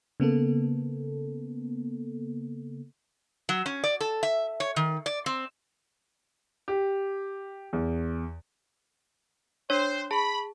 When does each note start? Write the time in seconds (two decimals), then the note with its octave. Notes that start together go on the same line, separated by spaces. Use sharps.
0.20 C#3 A#3 B3 A4
3.49 F#3
3.66 C#4
3.84 D5
4.01 A4
4.23 E5
4.60 C#5
4.76 D#3
5.06 D5
5.26 C4
6.68 G4
7.73 E2
9.70 D4 C5 C#5
10.11 G#4 A5 B5